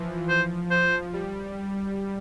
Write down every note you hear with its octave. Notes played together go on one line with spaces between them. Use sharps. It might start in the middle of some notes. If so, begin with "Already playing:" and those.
Already playing: E3 F3
C5
F3 C5
G3